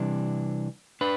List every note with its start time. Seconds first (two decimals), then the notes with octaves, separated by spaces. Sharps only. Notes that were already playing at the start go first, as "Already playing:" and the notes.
Already playing: C3 E3 G3 D4
1.01 D4 B4